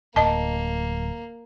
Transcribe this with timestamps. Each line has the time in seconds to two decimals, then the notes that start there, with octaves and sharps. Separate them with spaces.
0.16 D1 A#3 D#5 A5